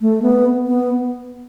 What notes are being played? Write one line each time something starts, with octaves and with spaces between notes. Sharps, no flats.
A3
B3
B3